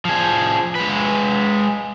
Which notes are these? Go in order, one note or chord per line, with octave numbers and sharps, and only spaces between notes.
F3 G#4
G#3 B4